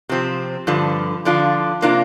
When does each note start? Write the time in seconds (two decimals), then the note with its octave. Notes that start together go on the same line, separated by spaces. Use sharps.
0.09 C3 F3 C4
0.67 G2 D3 F3
1.25 D3 F3 D4 F4
1.82 C3 A#3 D4 F4